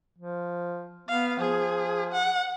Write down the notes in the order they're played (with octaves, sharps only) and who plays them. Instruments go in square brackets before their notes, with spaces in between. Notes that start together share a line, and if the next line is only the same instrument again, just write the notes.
[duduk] F3
[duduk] B3 [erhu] F5
[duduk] F3 [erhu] G#4
[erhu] F#5